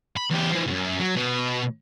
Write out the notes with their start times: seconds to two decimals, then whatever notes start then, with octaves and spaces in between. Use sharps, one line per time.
0.17 B5
0.31 E2 G4
0.51 E3 F3
0.67 C#2 F#2
1.00 F#3
1.16 B2